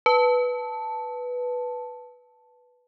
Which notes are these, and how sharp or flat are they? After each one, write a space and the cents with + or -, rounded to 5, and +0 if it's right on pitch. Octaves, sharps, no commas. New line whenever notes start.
B4 +0 A5 +0